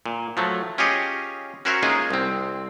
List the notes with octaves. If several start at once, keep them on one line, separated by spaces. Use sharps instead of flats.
A#2
F3 F#3 A3
C#4 F4 G4 G#4 C#5 D#5
C#4 F#4 A#4 C5 C#5 E5
G#3 A#3 C#4 D#4 F4 G#4
C2 C4